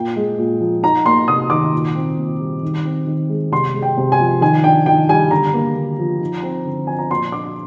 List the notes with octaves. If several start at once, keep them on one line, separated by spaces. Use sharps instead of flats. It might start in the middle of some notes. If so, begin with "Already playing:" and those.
Already playing: A#2 A#3 G5
G#3
A#2
F3
D#4 A#5
A#3 C6
C3 D#6
D#3 D6
A#2
C4
A#2
G3
D#3
C4
D#3
G#3
C3 C6
G#3
G5
C3
G#5
F3
D#3 G#5
D4 G5
D#3 G5
G3 G#5
D3 A#5
A#3
D3
F3
D#4
C4
D3
F3 G#5
A#5
A#2 C6
D4 D6